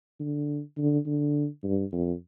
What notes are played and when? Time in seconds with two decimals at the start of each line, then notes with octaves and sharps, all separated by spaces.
0.20 D3
0.78 D3
1.06 D3
1.64 G2
1.92 F2